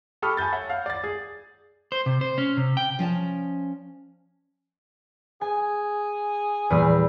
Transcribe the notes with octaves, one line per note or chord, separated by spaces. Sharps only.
G4 A4 B5 C#6 D#6 F6
G#5 A5 B5 G6 A6
C#5 E5 F#5
F5 F#5
D5 A6
G#4
C5
C3
C5
C#4
C3
G5
F3 C#4 D5 A5
G#4 G#5
E2 A#2 G3